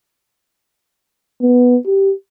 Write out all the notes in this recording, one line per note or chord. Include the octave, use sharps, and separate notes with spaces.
B3
G4